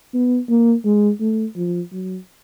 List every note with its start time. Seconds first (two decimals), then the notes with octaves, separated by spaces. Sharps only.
0.14 B3
0.49 A#3
0.85 G#3
1.21 A3
1.56 F3
1.92 F#3